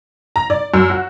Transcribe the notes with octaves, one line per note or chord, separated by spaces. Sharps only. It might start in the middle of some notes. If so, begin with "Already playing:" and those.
A#5
D5
F#2
F#4